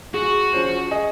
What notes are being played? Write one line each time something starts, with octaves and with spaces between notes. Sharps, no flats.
F#4 G#4
F3 C#4 C5
G#4 D#5 G#5